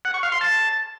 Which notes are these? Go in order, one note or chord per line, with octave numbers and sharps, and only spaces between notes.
F#5
C#6
F5
C6
A5